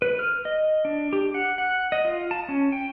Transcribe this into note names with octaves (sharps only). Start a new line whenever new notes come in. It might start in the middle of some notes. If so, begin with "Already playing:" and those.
B4
F6
D#5
D4
G4
F#5
F#5
D#5
F4
A5
C#4
G5